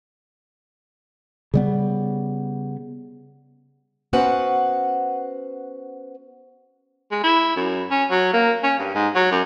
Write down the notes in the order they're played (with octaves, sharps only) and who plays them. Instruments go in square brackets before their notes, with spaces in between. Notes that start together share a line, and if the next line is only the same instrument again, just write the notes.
[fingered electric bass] C#3 G3 B3
[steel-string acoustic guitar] B3 C#4 F#4 B4 C5 F#5
[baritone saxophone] G#3
E4
F#2
C#4
F#3
A#3
C#4
G2
G#2
F#3
F#2